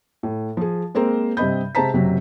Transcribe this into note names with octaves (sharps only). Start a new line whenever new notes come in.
A2
F3 G#4
G#3 A#3 C4 A#4 C5
G2 C3 C4 D#5 B5 G6
C3 G#3 C5 A5 A#5 B6
F#1 C3 F#3